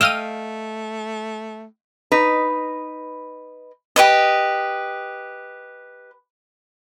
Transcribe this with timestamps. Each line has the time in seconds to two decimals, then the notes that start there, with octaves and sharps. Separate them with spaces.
0.01 A3 D#5 F5 G5 E6 F6 D#7
2.12 D#4 B4
3.96 G4 B4 D#5